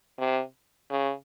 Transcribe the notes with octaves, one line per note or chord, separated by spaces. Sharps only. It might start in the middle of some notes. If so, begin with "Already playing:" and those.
C3
C#3